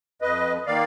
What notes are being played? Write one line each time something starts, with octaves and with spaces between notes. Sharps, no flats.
F2 B4 D#5
D#3 A#3 D5 F5